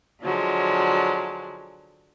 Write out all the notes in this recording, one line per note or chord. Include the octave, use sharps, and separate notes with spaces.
D3 F3 F#3 G#3